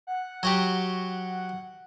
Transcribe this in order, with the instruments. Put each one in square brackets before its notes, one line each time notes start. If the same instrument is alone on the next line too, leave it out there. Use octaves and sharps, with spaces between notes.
[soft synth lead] F#5
[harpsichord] F#3 F#4 G4